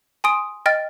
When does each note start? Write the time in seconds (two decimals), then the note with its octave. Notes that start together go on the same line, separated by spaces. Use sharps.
0.24 G#5 C6 D#6 D7
0.66 D#5 G5 F6 A6